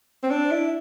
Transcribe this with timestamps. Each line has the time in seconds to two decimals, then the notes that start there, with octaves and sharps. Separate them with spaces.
0.23 C4
0.30 D4
0.51 E4